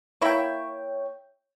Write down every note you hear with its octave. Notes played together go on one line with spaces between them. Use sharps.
A#3 E4 C#5 E5 G5